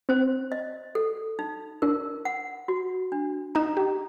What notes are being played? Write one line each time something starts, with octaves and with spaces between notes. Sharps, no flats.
C4 C5
D#5
A4
D#4
D4 A#4
F#5
F#4
D4
D#4 A#5
G4